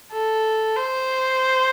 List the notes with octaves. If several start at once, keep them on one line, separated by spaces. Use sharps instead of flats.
A4
C5